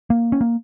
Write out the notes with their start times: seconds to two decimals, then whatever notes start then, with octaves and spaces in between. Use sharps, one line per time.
0.10 A#3
0.32 C#4
0.41 A#3